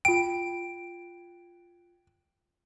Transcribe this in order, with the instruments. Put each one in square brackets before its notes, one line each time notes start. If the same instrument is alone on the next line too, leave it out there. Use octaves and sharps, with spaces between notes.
[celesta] F4 G5 [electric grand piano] D7